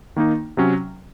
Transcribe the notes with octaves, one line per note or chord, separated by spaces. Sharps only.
D#3 A#3 D#4
C3 F#3 C#4